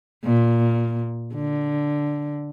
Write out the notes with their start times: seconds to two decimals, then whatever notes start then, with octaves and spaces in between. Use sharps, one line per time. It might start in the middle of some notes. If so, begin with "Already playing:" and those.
0.24 A#2
1.35 D3